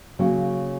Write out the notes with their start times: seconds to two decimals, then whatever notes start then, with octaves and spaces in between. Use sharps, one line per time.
0.19 C#3 F#3 A#3 C#4